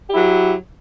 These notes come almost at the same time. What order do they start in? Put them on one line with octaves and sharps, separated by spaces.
G4 E4 F#3